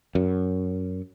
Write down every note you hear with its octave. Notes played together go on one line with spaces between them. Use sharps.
F#2